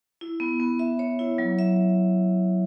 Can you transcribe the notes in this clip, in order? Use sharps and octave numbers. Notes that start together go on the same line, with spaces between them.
E4
B3
B3
E5
C#5
E4
F#3
E5